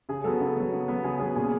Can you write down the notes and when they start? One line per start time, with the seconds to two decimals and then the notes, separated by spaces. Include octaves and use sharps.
0.09 C#3 G#4
0.24 F#3 B3 A4
0.41 C#3
0.57 F#3 B3
0.72 C#3
0.88 F#3 B3
1.04 C#3 G#4
1.20 F#3 B3 G#4
1.36 A#2 G#4